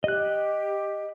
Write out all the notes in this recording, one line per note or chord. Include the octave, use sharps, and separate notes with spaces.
G4 D#5 F#6